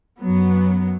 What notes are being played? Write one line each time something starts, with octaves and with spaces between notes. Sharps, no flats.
F#2 F#3 B3